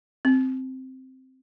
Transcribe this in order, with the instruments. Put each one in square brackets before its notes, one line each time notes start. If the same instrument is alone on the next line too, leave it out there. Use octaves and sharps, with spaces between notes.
[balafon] C4